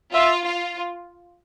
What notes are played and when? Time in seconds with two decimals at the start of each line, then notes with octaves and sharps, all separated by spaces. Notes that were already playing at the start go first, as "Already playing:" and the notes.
0.14 F4 E5
0.45 F4